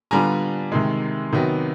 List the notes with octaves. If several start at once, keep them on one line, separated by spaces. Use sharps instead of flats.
D3 G3 B3 D4 F4 G#5 A#5
C3 D#3 G#3
C3 D#3 F#3 B3